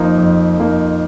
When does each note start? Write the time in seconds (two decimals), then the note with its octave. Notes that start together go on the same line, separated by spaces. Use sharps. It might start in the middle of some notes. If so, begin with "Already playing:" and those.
Already playing: F2 F3 A#3 D#4
0.18 F2
0.58 F3 A#3 D#4